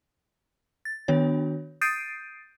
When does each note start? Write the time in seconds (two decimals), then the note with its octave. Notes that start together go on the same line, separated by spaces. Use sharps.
0.85 A6
1.08 D#3 B3 D4 F#4 C#5
1.81 D#6 G6 A6 C7 D7 D#7